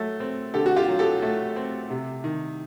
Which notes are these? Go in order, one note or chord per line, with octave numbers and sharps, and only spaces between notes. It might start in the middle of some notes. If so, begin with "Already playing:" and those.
Already playing: F#3 A3
C4
D3 G4 A4
F#4
F4 G4
F#3
G4 A4
A3
C4
C3
D#3